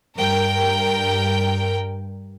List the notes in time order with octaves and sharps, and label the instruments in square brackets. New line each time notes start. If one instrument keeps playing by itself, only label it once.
[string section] G2 A#4 G5